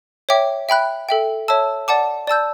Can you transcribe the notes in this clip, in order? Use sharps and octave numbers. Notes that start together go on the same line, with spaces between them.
C#5 E5 G5 D6
E5 G5 B5 F#6
A4 E5 G5
C#5 E5 A5 E6
D5 F#5 A5 D6
D5 A5 E6 G6